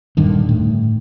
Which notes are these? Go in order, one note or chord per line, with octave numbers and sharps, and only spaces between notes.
D#1 G2 D3 D#3
A2